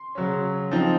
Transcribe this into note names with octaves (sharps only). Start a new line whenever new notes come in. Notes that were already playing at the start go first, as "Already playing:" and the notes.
Already playing: C6
C#3 F#3 C#4
F3 C4 D#4